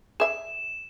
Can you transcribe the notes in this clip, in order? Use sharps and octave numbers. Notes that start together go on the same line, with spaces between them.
G#4 E5 E7